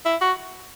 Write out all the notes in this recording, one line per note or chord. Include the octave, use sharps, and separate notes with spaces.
E4
F#4